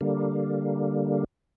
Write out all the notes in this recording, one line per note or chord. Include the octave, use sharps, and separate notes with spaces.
D3 G3 A#3